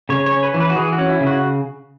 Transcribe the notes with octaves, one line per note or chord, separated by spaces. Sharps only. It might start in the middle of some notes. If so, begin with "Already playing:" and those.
C#3 C#5
C#5
C#4
B4
E3
B4
F#4
E3 G#4
F#4
C#4
E4
C#3
F#4